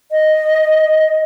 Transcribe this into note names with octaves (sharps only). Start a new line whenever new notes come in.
D#5